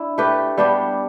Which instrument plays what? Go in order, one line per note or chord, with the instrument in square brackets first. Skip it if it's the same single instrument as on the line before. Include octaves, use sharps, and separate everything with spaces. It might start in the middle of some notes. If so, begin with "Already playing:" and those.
Already playing: [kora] D4 E4
A3 G4 B4
G3 B3 D4 G4